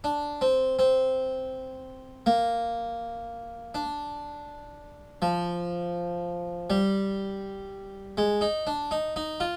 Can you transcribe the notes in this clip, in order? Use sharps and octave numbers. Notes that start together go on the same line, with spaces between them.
D4
C4
C4
A#3
D4
F3
G3
G#3
D#4
D4
D#4
D#4
F4